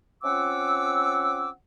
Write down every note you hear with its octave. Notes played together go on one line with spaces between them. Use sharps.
C4 C#4 F4 F#5 D6 E6